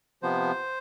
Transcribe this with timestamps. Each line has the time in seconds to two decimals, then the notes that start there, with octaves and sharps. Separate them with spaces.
0.23 C3 F3 B3 C5